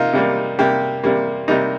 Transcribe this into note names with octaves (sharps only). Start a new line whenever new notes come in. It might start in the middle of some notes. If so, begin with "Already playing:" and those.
Already playing: C3 A#3 D#4 F4
C3 G3 A#3
C3 G3 A#3 G4
C3 G3 A#3
C3 G3 A#3 D#4